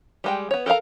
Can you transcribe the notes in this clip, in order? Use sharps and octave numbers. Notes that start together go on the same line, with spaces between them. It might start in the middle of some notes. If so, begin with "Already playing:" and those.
G3 G#3 G5
B3 C#5
A4 A#4 C5 F5 A#5